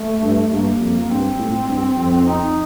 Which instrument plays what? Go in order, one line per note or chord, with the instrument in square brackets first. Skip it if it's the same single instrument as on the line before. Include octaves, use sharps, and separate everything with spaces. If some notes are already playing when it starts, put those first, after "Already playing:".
Already playing: [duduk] A3
[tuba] G2
[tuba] G2 [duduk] A#3
[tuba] F2
[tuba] G2 [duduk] C4
[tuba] A2
G2
F2
[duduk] D#4